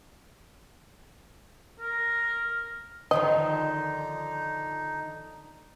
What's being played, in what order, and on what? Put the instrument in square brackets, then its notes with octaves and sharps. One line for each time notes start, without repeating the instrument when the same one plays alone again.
[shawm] A#4
[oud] D3 D#3 F3 [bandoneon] D#4 [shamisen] D#5